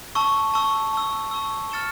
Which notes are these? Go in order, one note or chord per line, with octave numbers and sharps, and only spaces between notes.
A5 C#6 E6
A5 C#6 E6
A5 C#6 E6
A5 C#6 E6
F6 A6 C#7 E7 G7